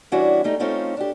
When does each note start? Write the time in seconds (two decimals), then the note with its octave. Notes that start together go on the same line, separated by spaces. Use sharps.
0.12 E3 G3 C#4 D4 E4 F#4
0.44 G3 A3 D#4
0.60 A3 C4 C#4 D#4 F4
0.97 D4 G4